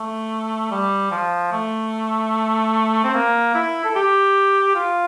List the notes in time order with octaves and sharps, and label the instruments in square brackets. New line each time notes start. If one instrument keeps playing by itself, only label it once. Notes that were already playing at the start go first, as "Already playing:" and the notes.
Already playing: [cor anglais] A3
G3
F3
A3
C4
A#3
E4
A4
G4
F4